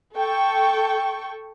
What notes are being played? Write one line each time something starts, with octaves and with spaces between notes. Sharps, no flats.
A4 G5 C#6